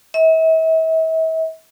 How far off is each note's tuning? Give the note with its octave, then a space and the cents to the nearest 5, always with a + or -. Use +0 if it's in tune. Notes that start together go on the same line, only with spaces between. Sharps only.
E5 -40